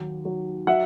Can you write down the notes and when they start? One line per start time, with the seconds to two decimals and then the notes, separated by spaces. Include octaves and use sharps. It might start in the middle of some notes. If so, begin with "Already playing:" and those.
Already playing: D#2 F#3
0.25 F#3
0.67 F#3 E5 F#5